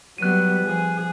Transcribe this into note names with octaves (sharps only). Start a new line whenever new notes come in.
F#3 G3 B3 F#6 D#7
F3 G#4